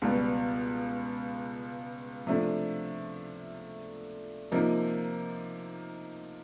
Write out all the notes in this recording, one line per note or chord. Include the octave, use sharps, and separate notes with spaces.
C#2 B2 G3 B3
C3 F3 A3 D4
C3 F3 A#3 D#4